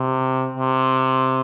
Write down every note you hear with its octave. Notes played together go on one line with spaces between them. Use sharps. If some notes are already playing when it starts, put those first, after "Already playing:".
Already playing: C3
C3